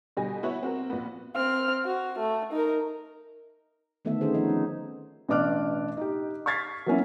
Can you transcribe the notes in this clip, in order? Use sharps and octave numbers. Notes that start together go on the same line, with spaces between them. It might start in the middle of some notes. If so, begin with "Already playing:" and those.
B2 D3 G3 G4 G#5 A#6
B3 E4 F#4 C#5 E5
C4 F#4 A#4
A#1 B3
C4 F6
F#4
A3
D#4 A#4
D3 D#3 A3 B3 A4 E5
D#3 C4 C#4 G#4 C5
F3 D#4
C#4
A1 B2 D4 D6 F6 F#6
D#4 G4
C#6 F6 G#6 A6 B6 C7
F#3 A#3 C#4 E4